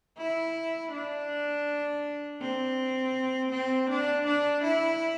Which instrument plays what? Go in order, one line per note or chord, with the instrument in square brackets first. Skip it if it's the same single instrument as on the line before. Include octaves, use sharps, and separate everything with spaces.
[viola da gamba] E4
D4
C4
C4
D4
D4
E4